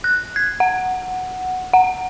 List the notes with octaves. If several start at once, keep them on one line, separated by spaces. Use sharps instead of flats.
F#6
G#6
F#5
F#5